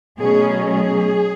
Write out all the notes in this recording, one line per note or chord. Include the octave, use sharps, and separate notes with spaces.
B2 F#3 A3 C#4 G#4
G#4